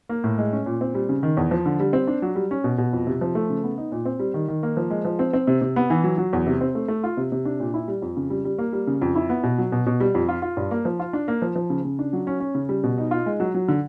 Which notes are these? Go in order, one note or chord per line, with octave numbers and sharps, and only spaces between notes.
A#3
A2
G#3
C#4
A#2
C4
G3
C#3
D#3
E2
F3
D3
G3
C4
D4
F#3
G3
C#4
B2
B2
F2
C3
F3
A3
C#3
B3
D#4
A#2
C4
G3
D#3
D#3
A#3
F3
G#3
F3
C4
C4
C3
C3
B3
E3
F#3
F#3
E2
C3
C4
A3
A3
F4
C3
C3
D4
A#2
E4
G3
F2
C#3
G3
G3
A#3
G3
C#3
F2
E4
B3
B2
F#3
B2
B2
G3
F2
F4
F4
G2
A#3
F3
F4
D4
A#3
F3
F3
C#3
C#3
D4
F#3
C#4
C#4
C#3
G3
B2
D#4
F4
G#3
F#3
F#3
D3